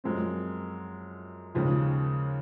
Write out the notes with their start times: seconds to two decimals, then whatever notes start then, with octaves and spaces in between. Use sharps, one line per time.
0.04 F#2 F3 G#3 C4
1.55 D#2 C#3 F3 G#3